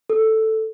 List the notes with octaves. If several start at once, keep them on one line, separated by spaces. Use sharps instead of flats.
A4